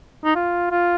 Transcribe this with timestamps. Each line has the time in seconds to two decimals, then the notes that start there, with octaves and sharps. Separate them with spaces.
0.25 D#4
0.35 F4
0.71 F4